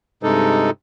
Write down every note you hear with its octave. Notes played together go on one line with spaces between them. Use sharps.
G2 C3 G#3 D#4 A4